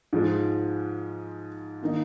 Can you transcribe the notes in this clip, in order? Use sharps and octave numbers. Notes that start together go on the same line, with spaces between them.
G#2 F3 G#3
D#3 A#3 D#4